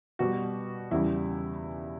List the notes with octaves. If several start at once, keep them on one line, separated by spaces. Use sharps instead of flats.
B2 G3 F#4
E2 C#3 G3 E4